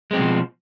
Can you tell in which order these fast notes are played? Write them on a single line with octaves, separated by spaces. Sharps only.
G#3 C4 F#3 B2 F3